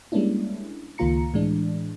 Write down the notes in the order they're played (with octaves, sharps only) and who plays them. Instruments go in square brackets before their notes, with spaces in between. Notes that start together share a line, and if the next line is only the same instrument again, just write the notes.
[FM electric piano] G3 G#3 A#3 C#4 D4 E4
C#2 D#3 A#3 F4 A#5 C#7
A2 E3 G#3 D4